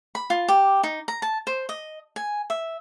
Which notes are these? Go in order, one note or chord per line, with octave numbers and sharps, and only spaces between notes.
B5
F4
G4
D#4
A#5
A5
C5
D#5
G#5
E5